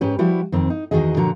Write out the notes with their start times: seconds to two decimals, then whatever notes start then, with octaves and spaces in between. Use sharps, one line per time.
0.01 G#2 C#4 G4 B4
0.19 F3 G3 E4 F#4 G4
0.52 F2 D#3 C4
0.70 D#4
0.91 E2 B2 D#3 F#4 G#4 D#5
1.16 A#2 D3 F3 F#4 A#5